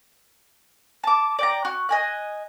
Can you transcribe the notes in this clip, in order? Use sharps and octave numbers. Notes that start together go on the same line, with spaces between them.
A5 D6
D5 G5 A#5
F#4
D#5 G#5 F#6